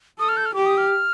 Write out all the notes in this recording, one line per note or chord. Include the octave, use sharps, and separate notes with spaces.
A4 D#6
F6
G6
F6
G4 D6
D#6
F6